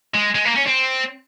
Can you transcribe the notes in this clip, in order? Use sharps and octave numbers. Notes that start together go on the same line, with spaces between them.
G#3
G#3
A#3
C#4
C4